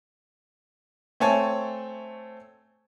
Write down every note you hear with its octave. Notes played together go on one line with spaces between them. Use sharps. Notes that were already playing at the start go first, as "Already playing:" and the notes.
A3 C4 C#5 G#5 A5